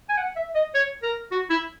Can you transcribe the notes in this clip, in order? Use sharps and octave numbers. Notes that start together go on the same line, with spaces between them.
G#5
F#5
E5
D#5
C#5
A#4
F#4
E4